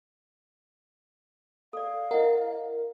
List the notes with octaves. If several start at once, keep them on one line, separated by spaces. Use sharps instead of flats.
A4 D5 F5
E4 A#4 D#5 F#5